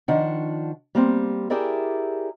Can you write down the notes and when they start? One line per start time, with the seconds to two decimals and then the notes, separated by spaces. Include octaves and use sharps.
0.08 D#3 F3 D4 F#5
0.95 G3 A#3 C4
1.50 E4 G4 G#4 A#4 D5 E5